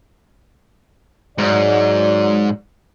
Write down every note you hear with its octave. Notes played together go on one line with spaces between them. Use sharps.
G#2 F#3 D5